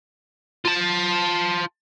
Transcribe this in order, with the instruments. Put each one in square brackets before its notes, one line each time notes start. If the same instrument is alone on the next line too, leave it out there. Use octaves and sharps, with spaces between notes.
[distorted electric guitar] F4 A5